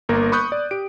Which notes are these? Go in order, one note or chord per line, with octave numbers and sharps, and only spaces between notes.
G1 A#3 A#4
B5 C#6 D#6 F#6 G6
D5
G4 D7